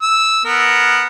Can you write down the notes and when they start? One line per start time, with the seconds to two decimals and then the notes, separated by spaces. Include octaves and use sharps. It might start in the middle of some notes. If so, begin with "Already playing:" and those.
0.02 E6
0.45 B3 A#4